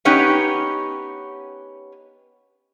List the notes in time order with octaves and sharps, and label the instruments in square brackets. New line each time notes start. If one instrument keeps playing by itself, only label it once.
[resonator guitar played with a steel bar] B3 C#4 D#4 G4 C#5